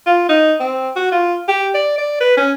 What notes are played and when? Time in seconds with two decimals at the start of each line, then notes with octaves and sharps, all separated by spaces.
0.07 F4
0.29 D#4
0.60 C4
0.96 F#4
1.12 F4
1.48 G4
1.74 D5
1.98 D5
2.21 B4
2.37 C#4